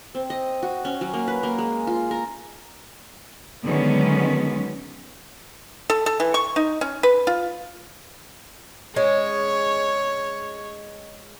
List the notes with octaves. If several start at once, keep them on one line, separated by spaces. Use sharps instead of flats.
C4
D#5
F#4
C#4
F#3
A#3
B4
A#3
G#3
F4
A#4
D3 D#3 F#3 G#3 B3 C#4
A4
A4
E3
C#6
D#4
C#4
B4
F4
G#3 C#4 C#5